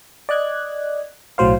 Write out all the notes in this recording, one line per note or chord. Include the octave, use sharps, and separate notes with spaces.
D5 D#5 F#6 G#6
B1 A2 F#3 C5 F5